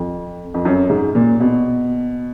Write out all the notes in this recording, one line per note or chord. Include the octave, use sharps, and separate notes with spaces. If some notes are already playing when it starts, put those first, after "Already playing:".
Already playing: F2
F2
F#2
G#2
A#2
B2